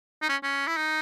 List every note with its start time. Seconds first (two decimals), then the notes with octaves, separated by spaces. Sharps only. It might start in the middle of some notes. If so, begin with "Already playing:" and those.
0.22 D#4
0.29 C#4
0.43 C#4
0.67 E4
0.77 D#4